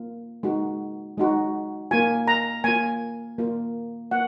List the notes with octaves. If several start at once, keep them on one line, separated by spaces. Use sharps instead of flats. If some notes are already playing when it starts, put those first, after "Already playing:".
Already playing: A#3 F4
G#3 D#4 F#4
G#3 D#4 F#4
A#3 F4 G#5
A#5
A#3 F4 G#5
A#3 F4
A#3 F4 F#5